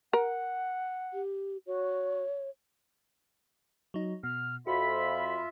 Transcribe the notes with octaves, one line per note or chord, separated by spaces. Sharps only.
A#4 F#5
G4
F#4 C#5
F#3 D#4
B2 F6
F2 F4 F#4 E5 B5 B6